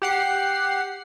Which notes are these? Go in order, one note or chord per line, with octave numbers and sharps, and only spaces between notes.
G4 F#5 C7